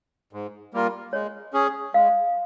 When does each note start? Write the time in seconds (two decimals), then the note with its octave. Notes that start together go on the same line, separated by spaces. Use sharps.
0.33 G#2
0.73 G3 A#3 F4 A#4
1.13 G#3 C#5
1.53 C#4 G#4
1.94 G#3 F5